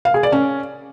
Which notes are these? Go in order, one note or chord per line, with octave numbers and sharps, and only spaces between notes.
F5
G#4
D5
C#4